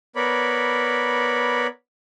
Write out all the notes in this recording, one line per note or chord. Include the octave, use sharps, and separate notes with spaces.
B3 A#4 C#5 D5 B5